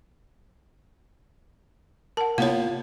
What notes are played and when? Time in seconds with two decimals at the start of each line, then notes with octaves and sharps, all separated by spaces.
2.17 A#4 F#5 A5
2.38 C3 A#3 B3 E4 F4 C#5 F5